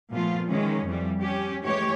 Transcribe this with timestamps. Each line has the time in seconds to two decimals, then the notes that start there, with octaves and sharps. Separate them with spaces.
0.12 A#2 F3 A3 B3 F4
0.48 D#3 E3 G#3 C#4
0.85 F2 E3 G3
1.22 C#4 G4
1.64 E3 G#3 A3 G4 C#5